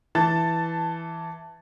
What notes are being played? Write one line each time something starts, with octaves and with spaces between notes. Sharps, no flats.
E3 A5 A6